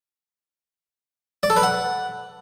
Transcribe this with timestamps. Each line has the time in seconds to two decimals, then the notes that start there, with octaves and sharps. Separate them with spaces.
1.43 D5
1.50 A4
1.57 B4
1.63 F#5